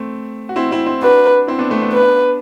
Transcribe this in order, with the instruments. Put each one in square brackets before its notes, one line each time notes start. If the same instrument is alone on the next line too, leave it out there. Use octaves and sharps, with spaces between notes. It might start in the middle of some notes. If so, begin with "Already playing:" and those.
Already playing: [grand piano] A3 C4
F#4
C4 E4
C4 E4
C4 E4
[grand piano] D4 F#4 [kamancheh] B4
[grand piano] C4 E4
B3 D4
A3 C4
B3 D4
[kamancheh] B4